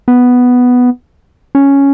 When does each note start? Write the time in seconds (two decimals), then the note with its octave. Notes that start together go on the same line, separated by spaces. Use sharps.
0.08 B3
1.55 C#4